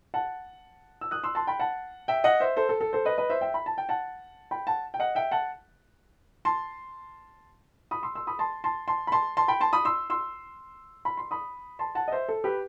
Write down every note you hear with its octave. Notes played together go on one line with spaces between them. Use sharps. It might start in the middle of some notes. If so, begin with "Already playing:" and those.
F#5 A5
E6
D#6 F#6
C6 E6
A5 C6
G5 B5
F#5 A5
E5 G5
D#5 F#5
C5 E5
A4 C5
A4
A4
A4 C5
B4 D#5
B4 D#5
C5 E5
E5 G5
B5
A5
G5
F#5 A5
G5 B5
F#5 A5
G5
D#5 F#5
E5 G5
F#5 A5
A5 C6
B5 D#6
C6 E6
C6 E6
B5 D#6
A5 C6
A5 C6
A5 C6
B5
A5 C6
A5 C6
G5 B5
A5 C6
B5 D#6
C6 E6
C6 E6
B5
C6
B5 D#6
A5 C6
F#5 A5
D#5
C5 E5
A4
G4 B4